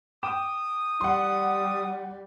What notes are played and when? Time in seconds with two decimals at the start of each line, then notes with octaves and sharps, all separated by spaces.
0.23 G5 D6 D#6 E7
1.01 G3 F#5 C6